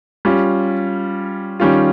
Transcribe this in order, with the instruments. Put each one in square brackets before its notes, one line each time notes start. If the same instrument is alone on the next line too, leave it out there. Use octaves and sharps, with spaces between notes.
[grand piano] G3 C#4 F4
D#3 G3 C#4 F4